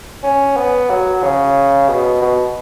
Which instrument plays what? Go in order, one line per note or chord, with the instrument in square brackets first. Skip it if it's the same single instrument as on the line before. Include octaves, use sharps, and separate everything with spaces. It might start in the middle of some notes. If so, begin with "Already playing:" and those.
[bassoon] C#4
B3
F#3
C#3
B2
B2